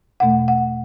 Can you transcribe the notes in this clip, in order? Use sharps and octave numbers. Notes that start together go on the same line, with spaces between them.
E2 B2 A3 F#5
F#5